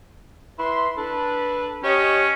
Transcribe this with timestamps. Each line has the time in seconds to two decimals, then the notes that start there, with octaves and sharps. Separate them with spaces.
0.59 E4 B4 C6
0.97 D4 A4 B4
1.84 C#4 G4 C#5 D#5